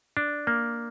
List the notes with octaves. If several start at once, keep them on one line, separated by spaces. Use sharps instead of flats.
D4
A#3